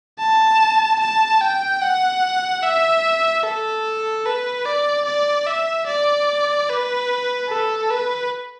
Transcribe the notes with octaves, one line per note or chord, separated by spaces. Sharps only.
A5
A5
G5
F#5
E5
A4
B4
D5
D5
E5
D5
B4
A4
B4